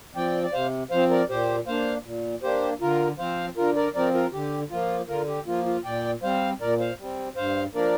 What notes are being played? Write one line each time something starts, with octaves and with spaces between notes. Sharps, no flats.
F3 C4 D5 G5
D5
C3 C5 F5
F3 C4 C5 F5
A#4 D5
A#2 G4 C5
A#3 D4 C5 F5
A#2
A#3 D4 G4 C5
D3 F4 A#4
F3 C4 C5 F5
D3 F4 A#4
A#4 D5
F3 C4 A#4 D5
F4 A#4
D3 G4
F3 A#3 F4
D3 F4 A#4
G4
F3 A#3 F4
F4
A#2 D5 G5
G3 C4 C5 F5
A#2 A#4 D5
C5 F5
G3 C4
G2 C5 F5
F3 A#3 D4 A#4 D5